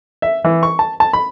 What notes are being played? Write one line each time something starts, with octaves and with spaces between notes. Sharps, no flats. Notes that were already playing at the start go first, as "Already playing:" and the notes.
E5
E3
C#6
A5
A5
B5